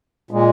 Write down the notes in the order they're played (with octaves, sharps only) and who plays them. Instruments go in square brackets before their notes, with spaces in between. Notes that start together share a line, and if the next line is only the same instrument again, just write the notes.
[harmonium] A#2 G#3